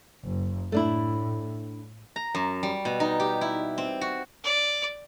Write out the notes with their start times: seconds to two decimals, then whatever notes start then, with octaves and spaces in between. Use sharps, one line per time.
0.24 F#1
0.72 A2 A3 D4 E4
2.16 A#5
2.35 F#2
2.63 G3
2.85 B2
3.00 D#4
3.20 G4
3.41 E4
3.78 C4
4.01 F#4
4.44 D5